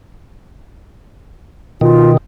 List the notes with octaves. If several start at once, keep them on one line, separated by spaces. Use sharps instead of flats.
B2 D#3 F4